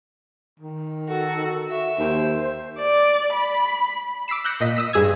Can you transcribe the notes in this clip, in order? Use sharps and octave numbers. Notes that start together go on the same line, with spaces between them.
D#3
F#4 A4
F#4 E5
D#2 C5
D5
B5
D6 E6 B6 C7 E7
E6 F#6 G6 A#6 C#7
A#2 D#5 B6
D#6 E6 B6
G2 G#4 D#6 E6 G#6